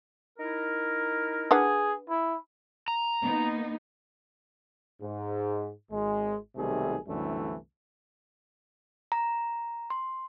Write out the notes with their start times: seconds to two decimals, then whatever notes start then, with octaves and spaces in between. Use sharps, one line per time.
0.38 D#4 E4 A#4
1.51 D4 G#4 B4 F#5
2.09 E4
2.88 A#5
3.23 A#3 B3 D#4
5.01 G#2
5.91 G#1 G#3
6.56 B1 C3 D#3 G3 A3 G#4
7.07 C2 F#2 D3 E3 G3 A3
9.12 A#5
9.90 C6